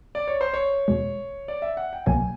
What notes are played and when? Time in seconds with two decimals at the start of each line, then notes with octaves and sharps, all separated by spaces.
0.15 D5
0.28 C#5
0.41 C5
0.54 C#5
0.88 E2 B2 G#3
1.48 D5
1.62 E5
1.77 F#5
1.93 G5
2.06 C2 B2 F#3 A#3 G#5